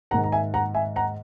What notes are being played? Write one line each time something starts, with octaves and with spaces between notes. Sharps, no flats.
G#2 D#3 F#5 A#5
A#5
E5 G#5
F#5 A#5
E5 G#5
F#5 A#5